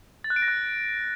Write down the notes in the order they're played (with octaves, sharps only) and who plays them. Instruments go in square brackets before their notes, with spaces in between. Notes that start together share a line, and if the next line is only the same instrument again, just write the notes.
[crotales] A6
F#6
D7
A#6
F#6